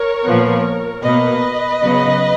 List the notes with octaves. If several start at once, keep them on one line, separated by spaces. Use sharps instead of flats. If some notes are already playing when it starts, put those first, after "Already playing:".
Already playing: A#4 C#5
A#2 F3 B3
B2 A#3 B4 D#5
C#3 F#3 B3